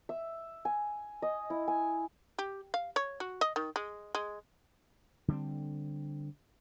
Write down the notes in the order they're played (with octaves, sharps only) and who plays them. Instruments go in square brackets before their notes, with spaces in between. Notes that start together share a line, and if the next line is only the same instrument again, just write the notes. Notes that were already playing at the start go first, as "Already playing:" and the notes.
[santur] E5
G#5
D#5
E4
G#5
[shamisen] G4
F5
C#5
F#4
D#5
D#3
G#3
G#3
[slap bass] D3 G3 A#3 C4